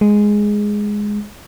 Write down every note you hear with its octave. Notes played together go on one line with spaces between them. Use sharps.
G#3